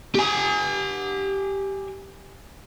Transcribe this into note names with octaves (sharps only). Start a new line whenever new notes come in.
G4 G#5